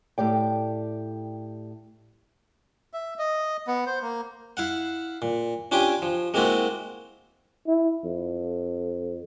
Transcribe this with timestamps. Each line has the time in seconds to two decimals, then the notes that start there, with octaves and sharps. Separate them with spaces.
0.18 A2 G4 D5 G5
2.93 E5
3.19 D#5
3.67 B3
3.87 C5
4.02 A#3
4.57 E4 F5 F#5
5.22 A#2
5.71 C#4 D4 F4 G4 G5 G#5
6.02 F3
6.34 G#3 A#3 C4 E4 F#4
7.68 E4
8.04 F2